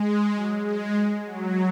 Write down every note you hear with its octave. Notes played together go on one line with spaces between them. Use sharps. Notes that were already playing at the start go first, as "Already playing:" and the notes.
Already playing: G#3
F#3
G#3
F#3